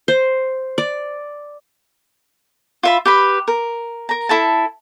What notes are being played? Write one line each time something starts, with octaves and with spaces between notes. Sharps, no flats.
C5
D5
F4 E5 B5
G4 B4 B5
A#4
A#4 A#5
E4 A4 A5